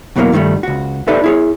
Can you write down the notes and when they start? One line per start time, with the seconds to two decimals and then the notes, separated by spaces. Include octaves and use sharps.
0.16 E2 B2 E3 F#3 G3 A#3
0.32 G2 D#3 E3 G3 A3
0.63 C#2 F#4
1.07 D#4 G4 A4 B4 D5 E5
1.24 E4 G#4 C#5